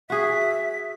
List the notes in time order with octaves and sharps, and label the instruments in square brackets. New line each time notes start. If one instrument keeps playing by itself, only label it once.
[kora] F#4 G#4 [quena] E5 [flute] B6